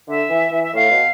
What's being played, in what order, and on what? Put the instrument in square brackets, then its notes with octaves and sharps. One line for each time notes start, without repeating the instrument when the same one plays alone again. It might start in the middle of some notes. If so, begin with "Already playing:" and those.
[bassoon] D3 [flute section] E5
[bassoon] E3
E3
[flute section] E5
[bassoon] A2 [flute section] F5
[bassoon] B2